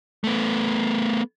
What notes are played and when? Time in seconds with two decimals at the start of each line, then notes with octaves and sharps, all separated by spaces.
0.24 A3 B3